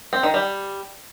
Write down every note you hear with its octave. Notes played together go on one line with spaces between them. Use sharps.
C4
D#3
G3